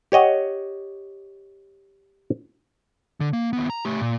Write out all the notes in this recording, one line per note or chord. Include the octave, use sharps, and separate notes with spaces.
G4 C#5 D#5 F#5
D3
A#3
D#2 B3
A#5
A3 G4
A#2